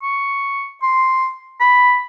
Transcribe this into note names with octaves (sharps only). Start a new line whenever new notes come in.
C#6
C6
B5